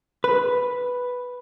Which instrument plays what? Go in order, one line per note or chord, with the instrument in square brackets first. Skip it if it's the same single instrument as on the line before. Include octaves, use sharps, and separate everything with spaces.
[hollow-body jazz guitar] B4